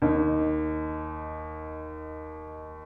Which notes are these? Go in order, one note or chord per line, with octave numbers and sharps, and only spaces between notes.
D#2 D#4